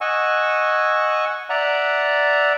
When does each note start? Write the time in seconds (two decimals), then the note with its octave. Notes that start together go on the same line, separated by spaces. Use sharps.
0.01 D#5 F#5 G#5 C#6 E6
1.50 D5 E5 F#5 A#5